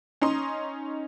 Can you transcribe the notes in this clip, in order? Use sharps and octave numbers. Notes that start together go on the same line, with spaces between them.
C#4 D#4 A#5 C6 D#6